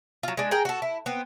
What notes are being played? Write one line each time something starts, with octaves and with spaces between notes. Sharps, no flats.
F#3 F4
G#3 D4
G#4 A#4 G5
F#4 A4
E4
B3 C4